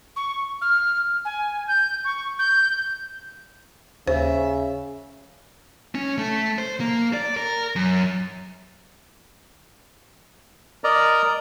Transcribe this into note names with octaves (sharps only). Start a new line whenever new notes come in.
C#6
F6
G#5
G6
C#6
G6
D#2 C#3 C5 E5
C#4
A3
C5
A#3
D5
A#4
F#2
A#4 D5 D#5 A#5